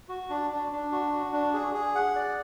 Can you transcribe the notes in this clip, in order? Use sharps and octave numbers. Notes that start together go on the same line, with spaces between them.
F#4
D4
D4
D4
F#4
F#4
D4
G#4
G#4
F#5
D5